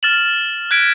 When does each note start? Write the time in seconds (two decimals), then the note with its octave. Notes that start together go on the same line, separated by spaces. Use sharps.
0.03 F6 A6 E7 F#7
0.71 F#6 G#6 B6 D7